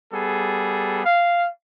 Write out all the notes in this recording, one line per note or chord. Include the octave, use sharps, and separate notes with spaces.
G3 B3 G#4 A4
F5